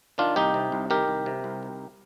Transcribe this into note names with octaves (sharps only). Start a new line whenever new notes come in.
D#3 D4 F4
C2 D#4 G4
C3
C2
D#3 G4 A#4
C2
C3
C2
D#3